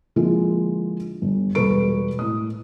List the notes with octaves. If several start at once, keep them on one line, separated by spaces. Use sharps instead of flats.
D3 F3 G#3 A#3 E4 F4
G1
E1 G3 A4 B4 C#6 D7
A2 D#6